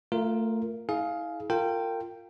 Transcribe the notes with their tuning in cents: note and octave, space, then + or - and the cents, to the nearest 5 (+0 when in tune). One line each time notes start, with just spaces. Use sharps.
A3 +25 F4 +0 A#4 +0
E4 -40 G#4 +25 F5 +0
F4 +0 A#4 -35 G5 +0